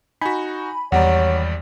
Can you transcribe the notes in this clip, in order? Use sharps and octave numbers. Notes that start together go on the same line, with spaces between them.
D#4 F#4 G#5 B5
G#1 E2 G3 C#5 D5 F#5 A#5